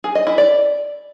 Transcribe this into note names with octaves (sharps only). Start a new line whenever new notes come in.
G#4
D#5
E4
D5